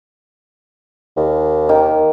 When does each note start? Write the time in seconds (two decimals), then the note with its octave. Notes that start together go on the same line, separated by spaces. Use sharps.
1.17 D#2
1.69 D#3